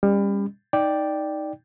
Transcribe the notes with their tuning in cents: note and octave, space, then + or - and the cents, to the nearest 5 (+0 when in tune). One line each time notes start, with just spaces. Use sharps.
G3 +30 C#4 +0
D#4 +5 D5 +0 G5 +0